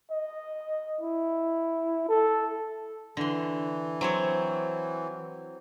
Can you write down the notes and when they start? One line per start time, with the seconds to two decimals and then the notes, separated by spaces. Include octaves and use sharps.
0.11 D#5
1.01 E4
2.09 A4
3.17 D3 E3 C6
4.01 F#3 C4 C#5